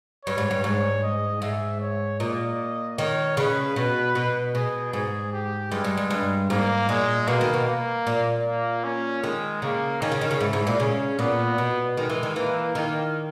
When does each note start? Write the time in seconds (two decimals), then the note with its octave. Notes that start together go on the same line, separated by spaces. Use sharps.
0.25 G2 C#5
0.38 G#2
0.51 G2
0.63 G#2 C#5
1.03 D#5
1.42 G#2 E5
1.81 C#5
2.20 A#2 D#5
2.98 D#3 C#5
3.37 C#3 B4
3.76 B2
4.15 B2
4.55 B2 G#4
4.93 G#2 G#4
5.33 G4
5.72 G2 G#3
5.84 G2
5.97 G2
6.10 G2
6.50 G#2 A#3
6.89 A#2 G#3
7.28 B2 A#3
7.41 D#3
7.54 B2
7.67 A#3
8.07 A#2
8.46 A#3
8.84 C#4
9.23 D#3 G#3
9.62 C#3 A#3
10.01 D#3 C#4
10.12 C#3
10.21 D#3
10.31 C#3
10.41 G#2 E4
10.53 G#2
10.67 A#2
10.80 C#3 C#4
11.19 A#2 B3
11.58 B2
11.96 D#3 G#3
12.10 E3
12.23 D#3
12.36 E3 A#3
12.75 D#3